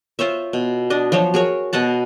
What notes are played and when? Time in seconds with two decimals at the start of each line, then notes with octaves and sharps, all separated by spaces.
0.19 F4 C5 C#5 E5
0.53 B2
0.90 D4 D#5
1.12 F3 F#3 C5 C#5
1.34 F#4 G#4 A#4 C#5
1.73 B2 D#5 F#5 A5